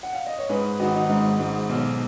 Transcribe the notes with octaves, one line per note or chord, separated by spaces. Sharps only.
F#5
F5
D#5
C#5
G#2 G#4 B4
G#1 D#4 F#4
D#4 F#4
G#2
G#2
B1